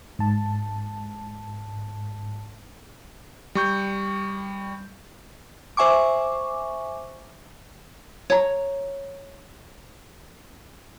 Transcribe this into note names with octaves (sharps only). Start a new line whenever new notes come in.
G#2 A5
G3 C#6 G6
C5 E5 G#5 C#6 D6
C#5 A#5